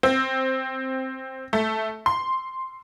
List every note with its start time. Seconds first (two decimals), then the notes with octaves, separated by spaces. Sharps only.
0.03 C4
1.53 A3
2.06 C6